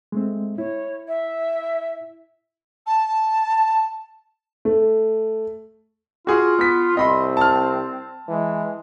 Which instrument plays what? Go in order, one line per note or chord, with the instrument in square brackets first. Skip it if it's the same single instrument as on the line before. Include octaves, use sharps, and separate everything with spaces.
[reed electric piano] G#3 A3 C4
[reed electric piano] E4 [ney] C#5
[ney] E5
[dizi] A5
[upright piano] A3
[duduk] F4 [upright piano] F#4 G#4
[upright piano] B3 B6
[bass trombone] C2 [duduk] C4 [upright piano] D#5 B5 C6
[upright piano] A5 F6
[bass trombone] E3 [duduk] G#3